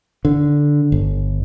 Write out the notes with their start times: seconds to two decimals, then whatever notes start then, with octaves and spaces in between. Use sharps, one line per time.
0.25 D3
0.92 G1